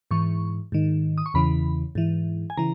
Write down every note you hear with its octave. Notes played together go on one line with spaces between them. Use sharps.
G#2 E3 C#6
G#2 D#3
D#6
C#6
E2 C#3 E3 B5
G#2 E3
G#5
C#3 E3 A#5